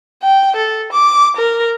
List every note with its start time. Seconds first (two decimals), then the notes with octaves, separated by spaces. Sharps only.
0.23 G5
0.56 A4
0.93 D6
1.37 A#4